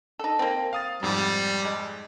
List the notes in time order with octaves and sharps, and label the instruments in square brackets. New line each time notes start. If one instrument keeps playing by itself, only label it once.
[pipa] D#4 A4
A#3 C4
[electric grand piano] F5 D#6 A6
[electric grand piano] F2 G#2 [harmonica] G3
[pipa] G#3